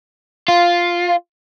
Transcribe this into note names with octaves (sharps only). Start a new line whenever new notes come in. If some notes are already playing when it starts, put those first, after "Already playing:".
F4